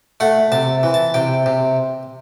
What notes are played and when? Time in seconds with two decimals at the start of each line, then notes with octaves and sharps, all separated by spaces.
0.20 A3 F#5
0.52 C3 A5
0.83 E3
0.94 A5
1.14 C3 G5
1.46 C3